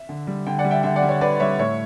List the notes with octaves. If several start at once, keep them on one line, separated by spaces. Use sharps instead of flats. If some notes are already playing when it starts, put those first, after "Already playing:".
Already playing: E5
D3
G3
D3 G5
D5 F#5
G3
E5 G5
D3 E5 G5
D5 F#5
G3
C#5
D3 B4 D5
G3 C#5 E5
A2 C#5 E5